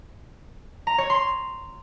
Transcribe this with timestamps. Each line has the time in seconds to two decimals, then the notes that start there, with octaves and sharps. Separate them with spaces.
0.87 A#5
0.98 C#5
1.10 C6